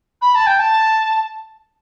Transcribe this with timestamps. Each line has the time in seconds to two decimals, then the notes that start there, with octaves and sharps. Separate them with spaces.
0.22 B5
0.35 A5
0.47 G5
0.59 A5